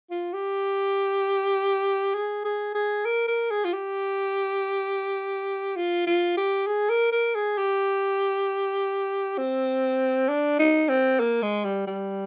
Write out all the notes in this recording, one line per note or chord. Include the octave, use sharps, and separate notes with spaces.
F4
G4
G#4
G#4
G#4
A#4
A#4
G#4
F4
G4
F4
F4
G4
G#4
A#4
A#4
G#4
G4
C4
D4
D#4
C4
A#3
G#3
G3
G3